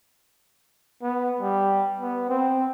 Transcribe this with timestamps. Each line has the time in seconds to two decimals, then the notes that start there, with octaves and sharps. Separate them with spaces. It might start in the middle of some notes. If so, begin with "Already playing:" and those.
1.02 B3
1.41 G3
1.99 B3
2.29 C4